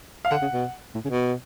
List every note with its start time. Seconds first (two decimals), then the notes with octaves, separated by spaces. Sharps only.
0.25 F5
0.31 D3 F#5
0.42 C#3
0.52 B2
0.94 A2
1.04 C#3
1.10 B2